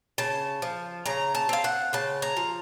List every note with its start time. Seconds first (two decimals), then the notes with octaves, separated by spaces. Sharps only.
0.18 C#3 A5
0.62 F3
1.06 C#3 A#5
1.35 A5
1.49 C4 F5
1.64 F#5
1.93 C#3 A5
2.22 A#5
2.37 F3